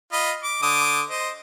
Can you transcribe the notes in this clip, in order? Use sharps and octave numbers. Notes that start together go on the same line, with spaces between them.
F4 D#5 B5
D6
D3 D6 D#6
C5 D#5